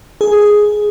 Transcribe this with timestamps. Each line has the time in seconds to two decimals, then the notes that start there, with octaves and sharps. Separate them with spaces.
0.21 G#4